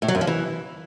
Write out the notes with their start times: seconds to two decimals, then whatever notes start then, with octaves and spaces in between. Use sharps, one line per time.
0.02 A2
0.08 F#3
0.15 F#2
0.21 F3
0.27 E3